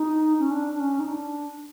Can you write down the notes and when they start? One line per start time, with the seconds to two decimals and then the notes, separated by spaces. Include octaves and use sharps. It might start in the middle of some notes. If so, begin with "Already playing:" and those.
Already playing: D#4
0.39 C#4
0.51 D4
0.75 D4
0.80 C#4
1.00 D#4
1.07 D4